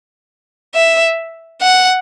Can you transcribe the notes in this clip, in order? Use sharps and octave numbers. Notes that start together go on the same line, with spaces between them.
E5
F#5